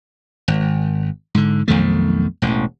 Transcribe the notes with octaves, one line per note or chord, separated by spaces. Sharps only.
G#1
G#2 D3
B1 F2 D#3 A3
E1 A1